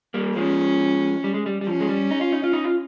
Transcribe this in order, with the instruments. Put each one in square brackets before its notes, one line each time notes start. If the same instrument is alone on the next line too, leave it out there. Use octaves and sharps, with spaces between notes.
[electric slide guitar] G3 A#3
[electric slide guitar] F3 G#3 [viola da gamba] C#4
[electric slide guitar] G3
G#3
G3
G3
[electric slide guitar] F3 [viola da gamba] C#4
[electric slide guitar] G#3
G3
D#4
F4
D#4
F4
D#4
F4